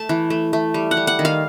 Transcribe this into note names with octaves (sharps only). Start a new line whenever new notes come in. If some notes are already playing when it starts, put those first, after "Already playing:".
Already playing: A3 A5
E3
A3
A3
G3
F#5
G3
F#5
D#3
F5